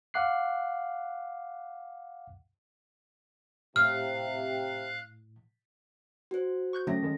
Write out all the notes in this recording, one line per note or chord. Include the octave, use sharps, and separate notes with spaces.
F5 F#5 D6 F#6 C7
A2 C3 F5 F6 F#6
F#4 C5
C#6 F#6 G6
D3 F#3 A3 C#4 A4 A#6
D#3 G#3